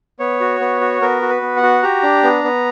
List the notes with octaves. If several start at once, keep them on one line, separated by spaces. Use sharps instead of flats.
B3 C#5
F#4
B3
F#4
B3 A#4
F#4
B4
B3
F#5
F#4
G4 A#5
D4
B3
B3